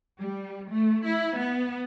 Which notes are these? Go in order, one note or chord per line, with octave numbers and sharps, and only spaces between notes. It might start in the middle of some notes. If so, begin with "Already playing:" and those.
G3
A3
E4
B3